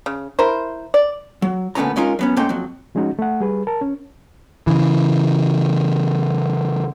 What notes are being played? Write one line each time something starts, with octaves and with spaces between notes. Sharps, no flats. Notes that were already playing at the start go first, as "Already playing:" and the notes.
C#3
E4 A#4 C5
D5
F#3
A#2 D3 A3 B3 C#4 A#5
G#3 C#4 D#4 F4 A#4
F#3 B3 C#4
G#2 A3 A#3 C#4 G5 C6
F2 F#3
F3 G#3 C#4 D#4 F#4
A3 F#5
G3 G#4 B4
A#4 A5
C#4
C#3 E3